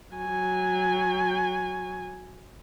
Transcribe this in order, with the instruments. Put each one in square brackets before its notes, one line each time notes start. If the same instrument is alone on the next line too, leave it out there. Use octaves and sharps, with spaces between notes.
[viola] F#3 G#5